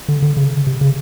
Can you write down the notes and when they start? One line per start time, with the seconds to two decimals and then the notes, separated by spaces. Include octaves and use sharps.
0.09 D3
0.22 D3
0.37 C#3
0.67 C3
0.81 C#3